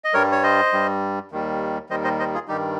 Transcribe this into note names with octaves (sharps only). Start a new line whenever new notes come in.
D#5
G2 G3 A#4 C#5
C#5
C5 D#5
G2 G3
D#2 D#3 G3
D#2 D#3 G3 C5 D#5
C5 D#5
C5 D#5
F4 G#4
G2 D#3 G3 D#4 G4